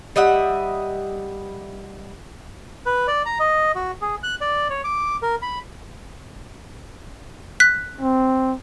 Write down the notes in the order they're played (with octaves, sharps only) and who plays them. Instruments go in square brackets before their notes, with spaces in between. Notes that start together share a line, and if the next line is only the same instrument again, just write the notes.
[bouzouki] G3 D#5 E5 F#5
[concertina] B4
D5
A#5
D#5
F#4
G#4
F#6
D5
C#5
D6
A#4
B5
[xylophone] F#6 B6
[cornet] C4